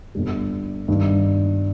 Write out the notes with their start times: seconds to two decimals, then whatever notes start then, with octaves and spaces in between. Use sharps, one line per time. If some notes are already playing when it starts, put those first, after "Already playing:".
0.15 G1 G2 G3
0.88 G2 D#3 G3